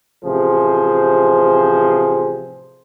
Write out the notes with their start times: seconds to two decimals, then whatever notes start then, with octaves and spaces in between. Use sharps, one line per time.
0.24 A1 C3 F3 G#4 C5